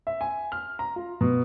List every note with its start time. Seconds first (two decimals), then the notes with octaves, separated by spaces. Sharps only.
0.07 E5
0.21 G#5
0.52 F6
0.79 A#5
0.96 F4
1.21 B2